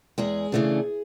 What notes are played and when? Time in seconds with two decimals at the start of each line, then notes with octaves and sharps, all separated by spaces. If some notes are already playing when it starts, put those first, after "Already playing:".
0.18 E2 G#3 G#4
0.52 C#3 E3 A3 D4